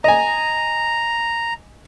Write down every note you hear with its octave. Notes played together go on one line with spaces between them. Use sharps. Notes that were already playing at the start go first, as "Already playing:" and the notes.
D#5 G#5 A#5